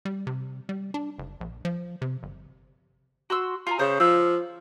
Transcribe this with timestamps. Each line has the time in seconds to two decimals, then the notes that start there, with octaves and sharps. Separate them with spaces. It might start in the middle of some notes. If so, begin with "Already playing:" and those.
0.05 G3
0.27 C3
0.69 G3
0.94 D4
1.18 F#1
1.41 A#1
1.65 F3
2.02 C3
2.23 G1
3.30 F#4 C6 E6
3.67 F4 G#5 A#5
3.79 C#3 C5
4.00 F3 E6 G6